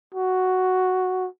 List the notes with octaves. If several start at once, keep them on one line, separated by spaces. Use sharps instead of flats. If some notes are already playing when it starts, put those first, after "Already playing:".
F#4